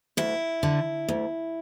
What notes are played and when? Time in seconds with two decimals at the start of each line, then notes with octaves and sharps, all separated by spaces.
0.17 D2 E4
0.63 D3
1.08 D2